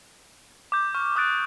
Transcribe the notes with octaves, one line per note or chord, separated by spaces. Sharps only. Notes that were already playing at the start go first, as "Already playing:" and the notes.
D6 G6
C#6 F6
D6 D#6 F#6 A6 D7